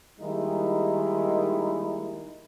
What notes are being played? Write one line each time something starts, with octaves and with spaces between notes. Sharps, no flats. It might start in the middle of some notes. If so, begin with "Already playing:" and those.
D#3 G3 G#3 A#3 D#4 E4